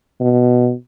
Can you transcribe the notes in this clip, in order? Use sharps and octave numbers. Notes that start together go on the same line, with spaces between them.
B2